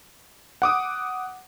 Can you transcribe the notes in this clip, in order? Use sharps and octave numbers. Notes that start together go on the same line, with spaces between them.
F#5 D6 D#6